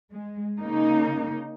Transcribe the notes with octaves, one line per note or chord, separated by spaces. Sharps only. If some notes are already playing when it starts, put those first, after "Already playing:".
G#3
C#3 A#3 D#4